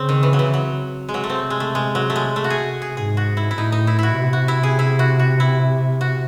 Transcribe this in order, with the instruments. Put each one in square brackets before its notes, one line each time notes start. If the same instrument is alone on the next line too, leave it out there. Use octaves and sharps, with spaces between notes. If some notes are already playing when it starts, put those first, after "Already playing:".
Already playing: [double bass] C#3 [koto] C4
[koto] D#3
E3
F#3
E3
F#3
G#3
[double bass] C3 [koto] F#3
[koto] A3
C4
G#3
A3
G#3
F#3
A3
G#3
A3
F#4
G#4
G#4
[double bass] G#2 [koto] G#4
[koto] F#4
E4
E4
[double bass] A2 [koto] D#4
[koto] D#4
E4
E4 F#4
[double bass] C3
[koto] F#4
E4
G#4
E4
F#4
F#4
E4
F#4